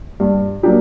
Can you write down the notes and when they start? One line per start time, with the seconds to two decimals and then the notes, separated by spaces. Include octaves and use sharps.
0.20 G2
0.63 F#3 A#3 D4 G4